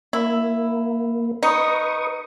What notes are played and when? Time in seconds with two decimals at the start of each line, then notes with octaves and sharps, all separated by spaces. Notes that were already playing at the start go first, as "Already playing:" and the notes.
0.13 A#3 E4
1.43 D#4 B4 C#6 D#6